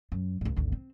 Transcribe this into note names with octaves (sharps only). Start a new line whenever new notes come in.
F#2
C#2 G#2
G#1 D2
C4